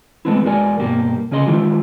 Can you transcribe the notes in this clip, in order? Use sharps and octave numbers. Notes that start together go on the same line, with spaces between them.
E3 G#3 A3 B3 C4 E4
E2 G#3 F#4 A#4 D5 G#5
G2 B2 A#3 G4
C#3 C#4 G#4 D#5 B5 C6
D#3 E3 G#3 E4 F4 G4